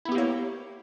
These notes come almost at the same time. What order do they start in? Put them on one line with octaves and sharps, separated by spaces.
E4 B3 G4 A#3 C#5